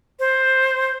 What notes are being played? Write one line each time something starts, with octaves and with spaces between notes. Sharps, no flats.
C5